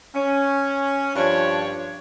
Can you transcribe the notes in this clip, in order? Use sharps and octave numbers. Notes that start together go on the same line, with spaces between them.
C#4
G2 F3 D4 C#5